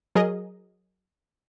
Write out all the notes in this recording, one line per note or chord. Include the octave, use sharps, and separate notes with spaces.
F#3 G#4 A#4 D#5